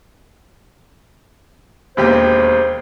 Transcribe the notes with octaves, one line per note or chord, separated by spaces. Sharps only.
E1 D#2 G4 C5